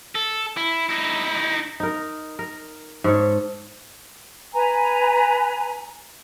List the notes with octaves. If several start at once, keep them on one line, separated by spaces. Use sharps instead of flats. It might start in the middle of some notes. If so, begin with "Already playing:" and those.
A4
E4
D#4 E4
D#4 A#4
A#4
G#2 A4 C#5
B4 G#5 A#5